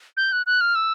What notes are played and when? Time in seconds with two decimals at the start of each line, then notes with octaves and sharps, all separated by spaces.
0.17 G6
0.32 F#6
0.46 F#6
0.61 F6
0.75 E6